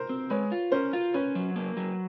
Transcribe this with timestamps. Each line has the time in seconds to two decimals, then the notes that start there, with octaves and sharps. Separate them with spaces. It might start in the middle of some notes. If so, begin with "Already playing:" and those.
Already playing: A#4 C5
0.09 C4
0.30 G#3 B4 C#5
0.52 F4
0.72 C#4 A#4 C5
0.93 F4
1.14 C#4 B4 C#5
1.35 F#3
1.56 A#3
1.77 F#3